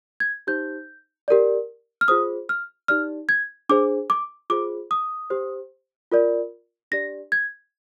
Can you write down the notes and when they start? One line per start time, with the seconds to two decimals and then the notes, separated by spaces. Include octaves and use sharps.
0.20 G#6
0.47 D#4 G4 C5 G6
1.28 G4 A#4 D5
2.01 F6
2.08 F4 G#4 C5 D#6
2.49 F6
2.88 D#4 G4 D5 F6
3.29 G#6
3.69 D4 G#4 C5 D6
4.10 D6
4.50 F4 G#4 C5 D6
4.91 D#6
5.30 G4 C5
6.12 F4 A#4 D5
6.92 D4 G4 D5 A#6
7.32 G#6